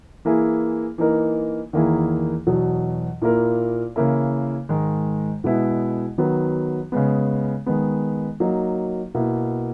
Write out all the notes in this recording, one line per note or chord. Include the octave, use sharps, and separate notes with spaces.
E3 A#3 E4 G#4
E3 A#3 D#4 A#4
E2 D#3 A#3 E4 G#4
E2 B2 F#3
A#2 A#3 E4 A#4
C#3 E3 A#3 E4 A#4
G#2 D#3 G#3
B2 G#3 B3 E4
D#3 F#3 B3
C#3 G#3 B3
D#3 G#3 B3
F#3 A#3 D#4
B2 A#3 E4